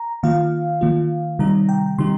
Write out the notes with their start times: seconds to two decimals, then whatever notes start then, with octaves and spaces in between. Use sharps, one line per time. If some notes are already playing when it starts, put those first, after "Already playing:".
Already playing: A#5
0.23 D#3 A#3 F4 F5
0.81 D#3 A#3 F4
1.39 C3 D#3 G3 D#4 A#5
1.69 G5
1.99 C3 D#3 G3 D#4 C6